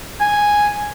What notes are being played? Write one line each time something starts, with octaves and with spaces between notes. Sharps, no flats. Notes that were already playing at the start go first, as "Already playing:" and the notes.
G#5